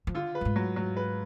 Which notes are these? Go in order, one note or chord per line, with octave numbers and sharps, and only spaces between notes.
F3
D3 F4
B4
F#2
G#2
F#3
F#3
B4